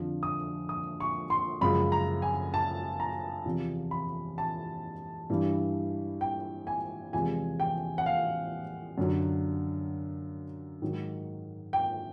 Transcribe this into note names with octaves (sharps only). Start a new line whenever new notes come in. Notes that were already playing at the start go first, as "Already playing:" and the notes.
Already playing: F2 D3 F3
D#6
D#6
C#6
C6
F#2 C#3 F3 G#3 B5
A#5
G#5
A5
A#5
E2 C3 F3
B5
A5
G2 E3 G3
G5
G#5
E2 C3 F3 G#3 G#5
G5
F#5
F5
F#2 D3 F#3
G#2 D#3 F#3
G5